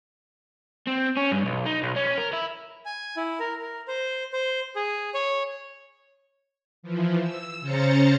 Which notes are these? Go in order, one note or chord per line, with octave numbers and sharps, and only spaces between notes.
C4
C#4
G2
B1
D#4
B1
C#4
A#4
E4
G#5
E4
A#4
A#4
C5
C5
G#4
C#5
E3 F3
E6
C#3 C#4 C5 A#5 A6 C#7